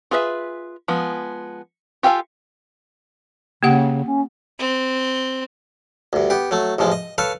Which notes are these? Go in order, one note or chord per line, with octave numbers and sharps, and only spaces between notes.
F4 G#4 B4 D#5 E5
F3 G#3 B3
F4 G4 A4 F5 G#5
C#3 A#3 G4 F#5
C#4
C4
D2 G2
B3 G4
F#3 A3
A1 A2 F3 G#3
D#5
A4 B4 C#5 F5